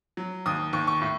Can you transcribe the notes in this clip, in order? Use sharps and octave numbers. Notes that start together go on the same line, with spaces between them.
F#3
D#2 D#6
D#2 C#6
C#6
A2